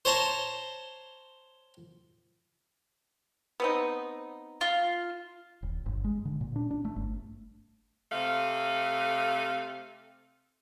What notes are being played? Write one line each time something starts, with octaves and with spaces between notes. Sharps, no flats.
C5 C#5 A5 A#5 C6
B3 C4 D#4
F4
D#1
G1
G#3
D3
A#2
D4
D4
A3
G1
C3 A3 F5